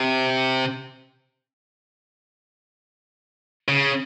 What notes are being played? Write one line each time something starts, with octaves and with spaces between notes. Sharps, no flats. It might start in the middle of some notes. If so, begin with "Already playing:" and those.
Already playing: C3
C#3